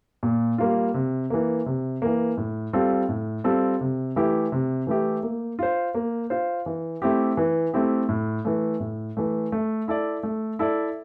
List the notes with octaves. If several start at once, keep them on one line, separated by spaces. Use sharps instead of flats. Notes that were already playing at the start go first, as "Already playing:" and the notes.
A#2
G3 A#3 F4
C3
E3 A#3
C3
E3 A#3
A2
G3 C4 F4 A4
A2
G3 C4 F4 A4
C3
E3 A3 E4 G4
C3
E3 A3 E4 G4
A#3
F4 C5
A#3
F4 C5
E3
A3 C4 E4 G4
E3
A3 C4 E4 G4
A2
E3 A3
A2
E3 A3
A3
E4 A4 D5
A3
E4 A4 D5